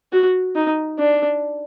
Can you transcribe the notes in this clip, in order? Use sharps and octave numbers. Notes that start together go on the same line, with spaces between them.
F#4
D#4
D4